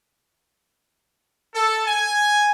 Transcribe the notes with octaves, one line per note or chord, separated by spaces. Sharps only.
A4
G#5